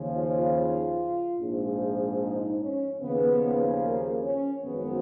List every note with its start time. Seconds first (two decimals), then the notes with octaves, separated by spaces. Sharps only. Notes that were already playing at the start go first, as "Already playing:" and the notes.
Already playing: D#2 C#3 F3
0.18 F4
1.40 A#1 G#2 F3
2.21 D#4
2.62 C#4
3.02 D#2 C#3 F3 B3
3.83 A#3
4.24 C#4
4.65 G#1 F#2 F3 B3